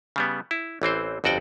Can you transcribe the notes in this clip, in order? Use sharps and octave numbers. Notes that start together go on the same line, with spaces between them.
C#3 G3 B3
E4
A1 E3 C4 C5
G1 F2 F#4 D5 G5